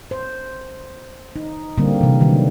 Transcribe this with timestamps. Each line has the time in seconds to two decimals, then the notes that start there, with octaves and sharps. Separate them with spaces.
0.11 C5
1.36 D#4
1.78 D3 G3 A#3 C4
2.01 C3 E3
2.21 D3 D#3 F#3